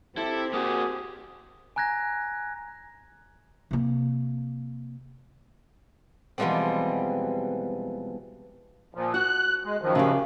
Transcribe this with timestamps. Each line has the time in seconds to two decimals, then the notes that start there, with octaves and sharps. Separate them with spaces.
0.17 C4 E4 G4 A4
0.53 A#3 F#4 G#4
1.76 G#5 A#5 F#6 G#6 A#6
3.71 C3 A#3
6.38 B2 E3 F3 G3 G#3 C4
8.95 A#2 F3
9.14 F#4 F#6
9.65 G#3
9.82 F#2 D#3 F3
9.95 C#3 G4